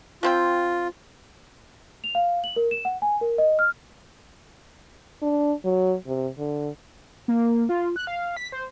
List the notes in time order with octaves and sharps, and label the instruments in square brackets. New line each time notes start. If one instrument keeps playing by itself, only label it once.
[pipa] F3 C4 G5 [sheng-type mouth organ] F4
[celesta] F7
F5
F#7
A#4
E7
F#5
G#5
A#4
D#5
F6
[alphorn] D4
F#3
C3
D3
[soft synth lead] A#3
F4
F#6
F5
B6
C5